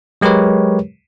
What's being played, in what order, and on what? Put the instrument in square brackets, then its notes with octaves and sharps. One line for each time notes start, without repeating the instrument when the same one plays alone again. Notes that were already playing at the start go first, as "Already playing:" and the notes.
[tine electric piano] F#3 G#3 G4 A#4 B4 C#5